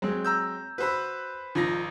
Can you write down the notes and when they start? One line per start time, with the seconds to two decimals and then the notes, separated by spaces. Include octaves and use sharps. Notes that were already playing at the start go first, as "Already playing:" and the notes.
0.02 F#3 G#3 C4
0.25 A#5 E6 G6
0.78 F#4 B4 C5 B5 E6
1.55 G#1 F3 D#4 A#6